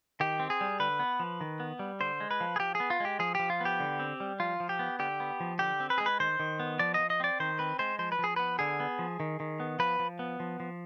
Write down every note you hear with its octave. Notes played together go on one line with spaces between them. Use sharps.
D#3 G4
C4
G#4
G3
D3 B4
B3
F3
D#3
B3
G3
D3 C5
G#3
B4
F3
G#4
F3 G4
G#4
B3
F4
G#3 G4
F3 G#4
F3 G4
F4
B3
G4
D3
C4
G3
F3 F4
F3
G4
B3
D3 G4
B3
F3
D3 G4
C4
B4
G#3 G#4
B4
D#3 C5
D#3
B3
F3 D5
F3 D#5
D#5
C4 D5
D#3 C5
C4 B4
G#3 C5
F3 C5
B4
F3 G#4
B3 B4
D3 G#4
B3
F3
D#3
D#3
B3
F3 B4
F3
B3
F3
F3